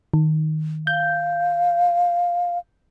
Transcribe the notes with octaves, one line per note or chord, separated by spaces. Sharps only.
D#3
F5 G6